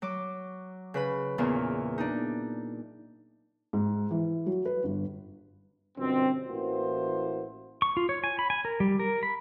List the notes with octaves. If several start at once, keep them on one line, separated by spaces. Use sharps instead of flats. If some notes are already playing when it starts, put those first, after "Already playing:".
F#3 D6
C#3 B4 B5
E2 A#2 C#3
D4 D#4
G#2
E3
F#3
B4
G1
G1 F#2 B2 C4
A1 E3 A#3 F#4 C5
C#6
F4
C#5
G#5
B5
G#5
A#4
G3
A#4
B5